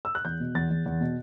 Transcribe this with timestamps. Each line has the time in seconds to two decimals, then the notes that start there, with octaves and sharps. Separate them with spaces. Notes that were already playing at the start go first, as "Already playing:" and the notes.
0.05 E6
0.15 F#6
0.25 E2 G6
0.40 B2
0.55 E2 A6
0.70 E2
0.86 E2
1.01 B2